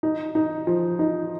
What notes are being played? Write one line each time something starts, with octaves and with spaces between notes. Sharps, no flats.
D#4
D#4
F3
D#4